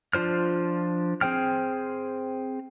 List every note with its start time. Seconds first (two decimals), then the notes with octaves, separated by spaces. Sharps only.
0.13 F3 D4 F4 C5 F6
1.21 C4 G#4 C5 G5 F6